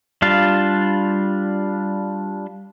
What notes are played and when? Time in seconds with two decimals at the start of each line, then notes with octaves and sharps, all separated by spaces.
0.22 G3 D4 F4 F5